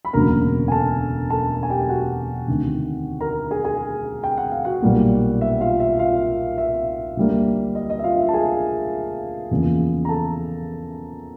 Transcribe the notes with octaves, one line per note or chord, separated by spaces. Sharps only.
B5
E1 D2 C#3 F#3 A#3 A#4 A#5
G#5
A4 A5
A4 A5
G#5
G4 G5
F#4 F#5
D2 C3 D#3
A#4 A#5
G#4 G#5
G#4 G#5
G5
F#5
F5
F#4 F#5
B1 A#2 G3 A#3
E5
F4 F5
E5
F4 F5
E5
D2 D3 G3 A#3
D#5
D#5
E5
F4 F5
E5
A5
G#4 G#5
E2 C#3 F3 A#3
A#5
A4 A5